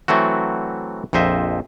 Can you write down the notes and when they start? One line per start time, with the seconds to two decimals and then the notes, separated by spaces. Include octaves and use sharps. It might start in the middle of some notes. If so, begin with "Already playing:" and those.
0.08 E3 F#3 A3 C4 F#4
1.13 A#1 F2 C5 D#5 E5